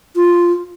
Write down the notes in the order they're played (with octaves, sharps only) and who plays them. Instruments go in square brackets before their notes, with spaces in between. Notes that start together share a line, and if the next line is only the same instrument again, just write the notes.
[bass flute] F4